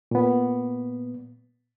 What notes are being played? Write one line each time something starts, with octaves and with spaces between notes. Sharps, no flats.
A#2 B3